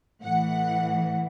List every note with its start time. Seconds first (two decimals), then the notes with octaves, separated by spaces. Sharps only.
0.22 A2 E3 F#5